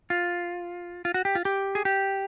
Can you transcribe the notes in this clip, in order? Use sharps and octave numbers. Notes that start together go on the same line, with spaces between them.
F4
F4
F#4
G4
F4
G4
G#4
G4